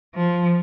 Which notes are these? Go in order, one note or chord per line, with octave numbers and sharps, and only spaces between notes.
F3